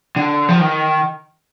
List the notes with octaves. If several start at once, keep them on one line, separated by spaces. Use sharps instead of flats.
D3
F3
D#3